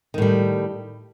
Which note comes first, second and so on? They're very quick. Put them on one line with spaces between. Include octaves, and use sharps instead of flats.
D#3 A2 G3